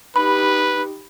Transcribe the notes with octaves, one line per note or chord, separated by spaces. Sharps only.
D#4 G4 B4 B5